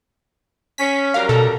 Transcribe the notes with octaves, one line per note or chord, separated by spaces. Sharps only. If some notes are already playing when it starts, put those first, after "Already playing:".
C#4 B6
F#2 G3 A#4 F5
B2 A4